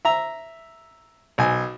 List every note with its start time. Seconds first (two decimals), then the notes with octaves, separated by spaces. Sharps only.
0.05 E5 A#5
1.38 B1 G#5